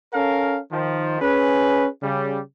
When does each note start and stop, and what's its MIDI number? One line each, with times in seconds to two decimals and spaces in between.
0.14 0.59 61
0.14 0.59 69
0.14 0.59 70
0.14 0.59 77
0.72 1.18 51
0.72 1.18 53
1.22 1.88 61
1.22 1.88 68
1.22 1.88 71
2.03 2.39 49
2.03 2.39 55